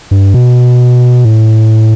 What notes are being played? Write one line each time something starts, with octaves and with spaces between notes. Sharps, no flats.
G2
B2
A2